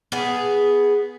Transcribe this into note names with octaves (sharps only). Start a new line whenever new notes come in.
B3 G#4